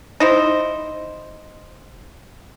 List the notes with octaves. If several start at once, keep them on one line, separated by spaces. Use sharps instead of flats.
D#4 E4 C5